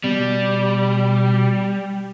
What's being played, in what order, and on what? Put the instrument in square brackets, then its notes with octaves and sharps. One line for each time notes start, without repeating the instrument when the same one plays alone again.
[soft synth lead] B2 [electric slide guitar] G3